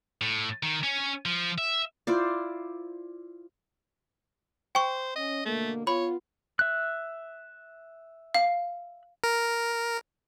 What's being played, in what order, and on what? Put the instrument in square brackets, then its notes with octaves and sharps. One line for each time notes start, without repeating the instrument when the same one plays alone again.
[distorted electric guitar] A2
D#3
C#4
F3
E5
[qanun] E4 F4 C5 D5
[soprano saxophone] C5 [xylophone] G5 C#6
[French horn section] C#4 [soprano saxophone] D#5
[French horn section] B2 D3 A#3 [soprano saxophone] A3
[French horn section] B3 F4 [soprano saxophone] C#5 [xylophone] B5
[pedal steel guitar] E5 F#6
[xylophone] F5
[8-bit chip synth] A#4